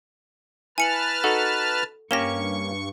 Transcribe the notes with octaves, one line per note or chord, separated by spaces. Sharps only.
E4 B4 G#5 A5 F6 C#7 F#7
D#4 F#4 A4 F#5
G2 A#3 C#4 G4 C#6 A#6 E7 G7